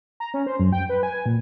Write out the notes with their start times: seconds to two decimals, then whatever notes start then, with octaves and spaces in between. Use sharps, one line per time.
0.20 A#5
0.34 C#4
0.46 C5
0.60 F#2
0.73 G5
0.89 B4
1.03 G#5
1.26 A#2